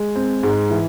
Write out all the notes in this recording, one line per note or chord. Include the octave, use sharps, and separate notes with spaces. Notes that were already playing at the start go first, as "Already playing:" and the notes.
Already playing: G#3
C4
G#2
E3